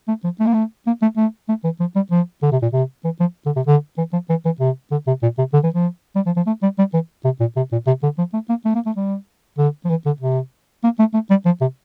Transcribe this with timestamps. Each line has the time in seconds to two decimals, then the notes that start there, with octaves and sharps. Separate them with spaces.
0.08 A3
0.24 F3
0.40 A3
0.47 A#3
0.54 A3
0.87 A#3
1.02 A3
1.17 A3
1.49 A3
1.64 E3
1.80 F3
1.96 G3
2.11 F3
2.43 D3
2.52 C3
2.62 A#2
2.73 C3
3.05 E3
3.20 F3
3.46 D3
3.56 C3
3.67 D3
3.98 E3
4.13 F3
4.30 E3
4.45 E3
4.60 C3
4.92 D3
5.07 C3
5.23 A#2
5.38 C3
5.53 D3
5.64 E3
5.74 F3
6.16 G3
6.26 F3
6.36 F3
6.47 A3
6.62 G3
6.79 G3
6.94 E3
7.24 C3
7.40 A#2
7.57 C3
7.72 A#2
7.87 C3
8.03 D3
8.18 F3
8.34 A3
8.49 A#3
8.65 A3
8.75 A#3
8.86 A3
8.96 G3
9.58 D3
9.85 F3
9.90 E3
10.06 D3
10.20 C3
10.84 A#3
10.99 A3
11.14 A3
11.30 G3
11.46 F3
11.61 C3